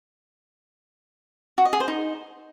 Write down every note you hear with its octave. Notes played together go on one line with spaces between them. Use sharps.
F#4
D#5
G#4
C5
D#4